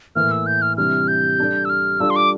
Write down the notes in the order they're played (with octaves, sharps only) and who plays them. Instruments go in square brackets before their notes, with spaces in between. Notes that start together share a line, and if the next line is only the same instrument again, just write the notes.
[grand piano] A2 E3 A#3 [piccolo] F6
[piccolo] E6
G6
F6
[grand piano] C3 E3 G3 D4 [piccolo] F6
[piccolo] G6
[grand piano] G3 D4 A4 D5
[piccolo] E6
F6
[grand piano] G3 D4 F4 A4 [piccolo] E6
[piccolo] C6
D6